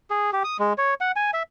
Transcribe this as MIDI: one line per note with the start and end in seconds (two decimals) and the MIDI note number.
0.10 0.31 68
0.33 0.43 67
0.44 0.57 87
0.59 0.73 56
0.78 0.94 73
1.01 1.12 78
1.16 1.31 80
1.34 1.43 76